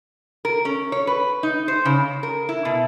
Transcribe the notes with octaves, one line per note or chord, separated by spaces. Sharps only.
A#4
C#4
C#5
B4
D#4
C5
C#3
A#4
E4
B2